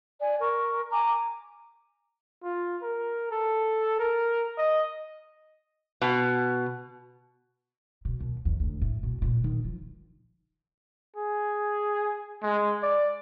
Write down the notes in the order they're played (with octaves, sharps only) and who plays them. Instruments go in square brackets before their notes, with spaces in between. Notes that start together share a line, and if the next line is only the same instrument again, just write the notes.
[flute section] D5 G#5
A#4 C#6
G#5 A#5 D6
[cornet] F4
A#4
A4
A#4
D#5
[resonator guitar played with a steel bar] B2
[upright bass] B2
D#2
E2
D2
A2
B2
A#2
D#3
F3
[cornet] G#4
G#3
D5